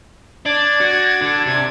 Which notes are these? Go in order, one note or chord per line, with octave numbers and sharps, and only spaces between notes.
D4 D5 G#6
F#4
D3
C3 G#6